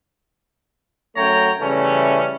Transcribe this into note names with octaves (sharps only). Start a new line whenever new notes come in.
F#2 A3 F#4 C#5 G5 A#5
C#3 E3 G3 A3 C#4